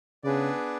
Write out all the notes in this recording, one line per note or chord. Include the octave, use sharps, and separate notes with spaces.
C#3 B3 D4 G#4 B4 D5